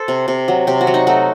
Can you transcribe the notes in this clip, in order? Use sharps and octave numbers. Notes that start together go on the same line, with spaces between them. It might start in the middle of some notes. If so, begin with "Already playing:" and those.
Already playing: A4 C5
C3
C3
F#3
C3 G4
F#4
F#3
D#4
A3 F#4